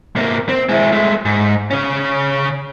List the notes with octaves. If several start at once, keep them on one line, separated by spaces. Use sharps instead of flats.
C3 A#3
C4
G#3 E4
G#3 A3
G#2
C#3 C#4